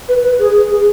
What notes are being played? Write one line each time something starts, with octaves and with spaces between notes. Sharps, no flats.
B4
B4
G#4
G#4